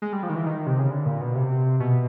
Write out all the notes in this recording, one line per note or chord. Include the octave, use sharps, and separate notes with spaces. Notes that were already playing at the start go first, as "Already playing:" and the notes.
G#3
G3
F3
D#3
E3
D#3
C3
C#3
D3
A#2
B2
C3
B2